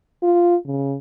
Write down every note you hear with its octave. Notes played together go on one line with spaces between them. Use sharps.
F4
C#3